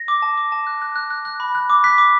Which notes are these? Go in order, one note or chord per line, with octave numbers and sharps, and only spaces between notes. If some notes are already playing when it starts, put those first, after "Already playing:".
Already playing: A#6
D6
A5
D6
A5
F#6
F#6
F#6
F#6
F#6
B5
F#6
D6
F#6 B6
D6